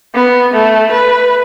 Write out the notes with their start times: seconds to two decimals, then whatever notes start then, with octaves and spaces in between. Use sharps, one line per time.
0.15 B3
0.53 A3
0.92 B4